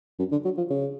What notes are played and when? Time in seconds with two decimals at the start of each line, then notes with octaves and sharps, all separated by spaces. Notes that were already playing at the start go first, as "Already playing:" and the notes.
0.19 F#2
0.32 D3
0.45 F#3
0.58 F3
0.70 C#3